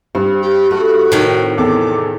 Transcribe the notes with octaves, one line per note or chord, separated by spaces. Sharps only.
G2 C4
G4
A3 F#4
A2 C3 D#3 A3 G4
E2 A4 D6